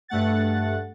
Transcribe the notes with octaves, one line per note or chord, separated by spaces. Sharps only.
G2 A3 F#5 A6